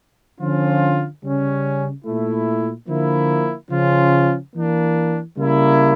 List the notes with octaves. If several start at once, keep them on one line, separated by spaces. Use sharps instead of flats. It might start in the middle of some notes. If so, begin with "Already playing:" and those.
D3 F3 C#4 F4
C#3 G3 C#4
A#2 A3 E4
D3 F3 A#3 E4
C#3 F3 C#4 F4
E3 A#3 D4
C#3 G3 A#3 E4